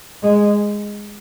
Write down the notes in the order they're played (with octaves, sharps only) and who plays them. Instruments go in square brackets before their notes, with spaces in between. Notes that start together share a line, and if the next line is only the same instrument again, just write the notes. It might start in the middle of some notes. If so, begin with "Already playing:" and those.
[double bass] G#3